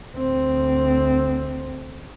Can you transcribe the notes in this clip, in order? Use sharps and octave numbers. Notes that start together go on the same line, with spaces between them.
D2 C4